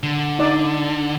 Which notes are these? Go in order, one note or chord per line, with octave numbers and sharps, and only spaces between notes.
D3
D#4 D5